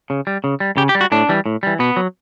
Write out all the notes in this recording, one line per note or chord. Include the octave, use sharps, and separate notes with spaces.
C#3
G3
C#3
G3
C#3 G4
G4
G3
F#4
A2 D4
E3 G3
A2
E3 G3
B2 B3
F#3